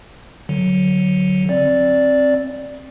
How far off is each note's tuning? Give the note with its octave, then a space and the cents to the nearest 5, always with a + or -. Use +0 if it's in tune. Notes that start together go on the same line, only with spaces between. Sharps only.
D3 +0 F#3 +0
C4 +15 D5 -5